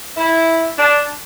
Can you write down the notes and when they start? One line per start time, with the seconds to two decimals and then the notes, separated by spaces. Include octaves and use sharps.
0.17 E4
0.77 D4